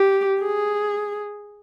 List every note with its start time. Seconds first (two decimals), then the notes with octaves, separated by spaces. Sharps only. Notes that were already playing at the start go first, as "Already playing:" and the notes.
Already playing: G4
0.41 G#4